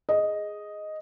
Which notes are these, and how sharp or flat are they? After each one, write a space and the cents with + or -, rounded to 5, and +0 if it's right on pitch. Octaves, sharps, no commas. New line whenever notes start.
G#4 +0 D#5 +0